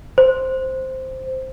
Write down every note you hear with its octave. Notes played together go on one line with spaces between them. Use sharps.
C5